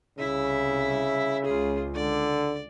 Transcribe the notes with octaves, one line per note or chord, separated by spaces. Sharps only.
C2 C#3 E4 E5
C#2 F4 G#4
D3 D5